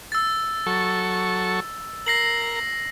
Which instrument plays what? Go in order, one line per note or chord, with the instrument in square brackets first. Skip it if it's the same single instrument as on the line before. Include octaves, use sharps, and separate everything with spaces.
[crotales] E6 A6
[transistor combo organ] F#3 A4 C#6
[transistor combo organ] A#4 [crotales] A#6 C7 F#7